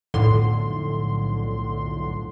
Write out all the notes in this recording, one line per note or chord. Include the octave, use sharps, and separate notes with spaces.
B1 F2 A2 D3 C6